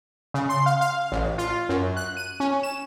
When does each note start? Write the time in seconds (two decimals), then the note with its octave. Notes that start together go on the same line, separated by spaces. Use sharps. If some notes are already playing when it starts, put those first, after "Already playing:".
0.34 C#3
0.49 C6
0.66 F5
0.81 F5
1.12 A1
1.38 F4
1.69 F#2
1.97 F#6
2.17 D#7
2.40 C#4
2.63 E7